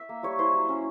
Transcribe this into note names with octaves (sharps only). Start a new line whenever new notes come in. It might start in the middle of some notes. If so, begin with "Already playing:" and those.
Already playing: E5
A#3
G3 C#5
E4 C5
F#3
C#4